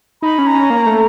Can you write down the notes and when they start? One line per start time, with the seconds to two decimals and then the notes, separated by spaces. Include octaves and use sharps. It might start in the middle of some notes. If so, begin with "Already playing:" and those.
0.22 D#4 B5
0.38 C#4
0.47 A#5
0.54 C#4
0.70 A#3
0.86 A3